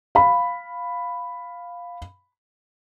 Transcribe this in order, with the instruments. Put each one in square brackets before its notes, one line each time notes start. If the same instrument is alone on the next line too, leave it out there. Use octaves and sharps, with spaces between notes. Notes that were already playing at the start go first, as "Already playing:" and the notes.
[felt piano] F5 B5